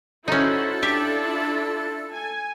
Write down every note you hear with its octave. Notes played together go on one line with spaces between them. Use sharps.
C#4 D#4 E4 F#4 A4 C5
D4 E4 F4 G4 E5
G#5